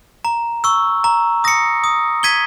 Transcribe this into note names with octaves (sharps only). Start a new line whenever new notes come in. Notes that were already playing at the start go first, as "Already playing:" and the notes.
A#5
C#6 E6
A#5
D#6 A#6 C#7
D#6
G#6 B6 D#7 G7